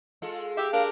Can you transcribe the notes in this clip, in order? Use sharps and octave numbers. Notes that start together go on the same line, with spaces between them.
G#3 F4 A4
G4 E5
D4 G4 A#4 F5